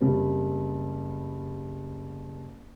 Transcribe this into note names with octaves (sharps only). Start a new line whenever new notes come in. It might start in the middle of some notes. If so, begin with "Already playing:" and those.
F#1 G3 C4